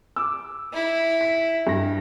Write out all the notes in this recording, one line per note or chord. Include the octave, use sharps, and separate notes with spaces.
D6 E6
E4
B6
G2 A#6